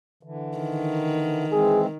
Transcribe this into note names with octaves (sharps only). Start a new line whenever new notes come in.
D3 E3
D#3
E3 G#3 C4 G#4